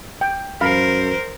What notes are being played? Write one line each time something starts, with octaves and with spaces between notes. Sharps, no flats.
G5
F#2 A#4 C5 F5 B5